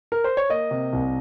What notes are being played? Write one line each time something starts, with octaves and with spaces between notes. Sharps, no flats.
A#4
C5
C#5
A#3 D#5
C3
C2